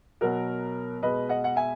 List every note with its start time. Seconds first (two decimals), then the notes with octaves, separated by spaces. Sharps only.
0.21 B2 F#3 F#4 A#4
1.02 B2 G#3 B4 D#5
1.29 D#5 F#5
1.44 F#5
1.56 E5 G#5